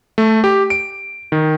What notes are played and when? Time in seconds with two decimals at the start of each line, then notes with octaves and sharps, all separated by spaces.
0.18 A3
0.44 G4
0.70 D7
1.32 D#3